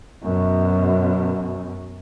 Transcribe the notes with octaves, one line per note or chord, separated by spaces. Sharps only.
F#2 B2